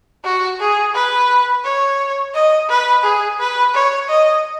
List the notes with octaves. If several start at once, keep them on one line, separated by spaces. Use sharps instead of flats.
F#4
G#4
B4
C#5
D#5
B4
G#4
B4
C#5
D#5